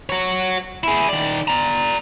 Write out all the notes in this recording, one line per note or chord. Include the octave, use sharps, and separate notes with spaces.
F#4 C#5
E4 G#4
D#3 D5
D5 A#5